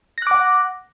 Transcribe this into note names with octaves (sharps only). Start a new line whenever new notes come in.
F#5 D6 F#6 A#6